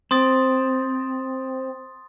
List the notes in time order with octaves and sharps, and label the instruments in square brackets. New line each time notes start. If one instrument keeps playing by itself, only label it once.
[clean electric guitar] C4 [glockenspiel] C6 D#6 A6